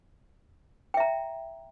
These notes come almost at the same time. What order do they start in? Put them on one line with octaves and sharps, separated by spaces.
G5 E5 A#5